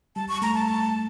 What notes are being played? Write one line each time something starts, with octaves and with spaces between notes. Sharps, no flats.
G3 A5
C#6
A3 A#5
A5